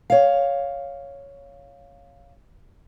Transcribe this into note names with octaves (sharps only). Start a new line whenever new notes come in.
C#5 F5